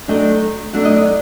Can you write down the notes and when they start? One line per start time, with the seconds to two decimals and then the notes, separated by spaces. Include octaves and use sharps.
0.08 F#3 A3 D4 D#5 G5
0.73 F#3 A3 D4 F#5
0.85 D#5
0.96 D5 F#5